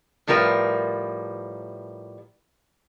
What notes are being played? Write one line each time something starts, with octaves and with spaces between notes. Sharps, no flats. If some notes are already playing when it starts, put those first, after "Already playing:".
A2 F3 G3 A#4 B4